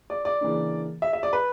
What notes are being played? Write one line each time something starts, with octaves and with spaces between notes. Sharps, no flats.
D5
D5
C#3 E3 A#3 D4
E5
E5
D5
B4